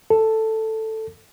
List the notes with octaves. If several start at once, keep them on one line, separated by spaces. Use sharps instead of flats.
A4